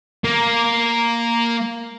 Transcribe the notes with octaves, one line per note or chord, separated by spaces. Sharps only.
A#3